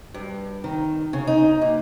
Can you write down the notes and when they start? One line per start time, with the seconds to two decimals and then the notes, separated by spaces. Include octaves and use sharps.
0.14 G2
0.64 D#3
1.13 C#3
1.27 D#4
1.62 A#2